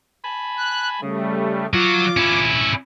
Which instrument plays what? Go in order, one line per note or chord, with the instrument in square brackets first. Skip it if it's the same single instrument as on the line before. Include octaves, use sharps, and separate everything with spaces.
[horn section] G#5 A5 B5
[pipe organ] F#6
[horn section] C#3 [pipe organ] G3 A3
[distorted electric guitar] F#3 F#4 [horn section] F4 [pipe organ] D6
[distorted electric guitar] C#4 E4